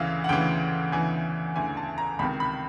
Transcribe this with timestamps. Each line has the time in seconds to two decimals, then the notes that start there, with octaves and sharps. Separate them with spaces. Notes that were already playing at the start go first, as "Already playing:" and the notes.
Already playing: D2 C#3 E3 F5
0.24 F#5
0.29 D2 C#3 E3 G5
0.92 D2 C#3 E3 G#5
1.55 D2 C#3 E3 G#5
1.77 A5
1.98 A#5
2.19 C#2 C3 D#3 B5
2.40 B5